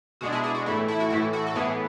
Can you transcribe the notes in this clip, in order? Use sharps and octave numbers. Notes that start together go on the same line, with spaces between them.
B2 G#3 D4 F#4
E4 G#4
E4 G#4
F#4
A2 E3 A3 E4
E4
F#4
A2 E3 A3 E4
F#4
A4
A2 E3 B3 E4 G#4